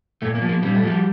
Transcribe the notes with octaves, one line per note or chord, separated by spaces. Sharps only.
A#2 A3
A#3
F3
A#3
A#2 G3
A3
F3 G3